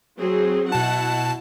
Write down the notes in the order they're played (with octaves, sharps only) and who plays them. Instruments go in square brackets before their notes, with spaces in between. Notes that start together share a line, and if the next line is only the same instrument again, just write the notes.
[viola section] F#3 C4 G#4
[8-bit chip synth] B2 A5 [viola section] E4 F#5